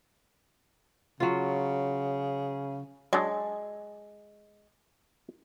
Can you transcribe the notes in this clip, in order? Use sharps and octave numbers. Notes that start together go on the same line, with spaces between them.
C#3 F#3 F4
F#3 G#3 D4 G#4